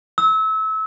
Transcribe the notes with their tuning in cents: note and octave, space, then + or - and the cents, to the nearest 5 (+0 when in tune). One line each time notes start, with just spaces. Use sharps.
E6 -30